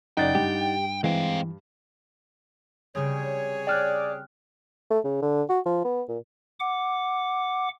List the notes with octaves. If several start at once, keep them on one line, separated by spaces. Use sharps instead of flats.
F#1 D#4 D5 F#5 G5 A6
G2 G4
G#2 E3 G#3 C4 F5
C#3 G3 C4 G#4 C#5
D5 G5 F6 F#6
A3
C#3
D3
F#4
F3
B3
A#2
F#5 D6